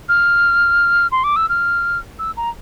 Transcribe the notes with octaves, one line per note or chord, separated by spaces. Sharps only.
F6
C6
D6
E6
F6
E6
A#5